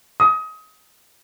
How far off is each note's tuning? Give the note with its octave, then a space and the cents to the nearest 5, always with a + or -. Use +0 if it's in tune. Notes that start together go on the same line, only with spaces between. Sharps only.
D#6 +25